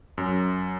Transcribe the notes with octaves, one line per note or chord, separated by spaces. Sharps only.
F#2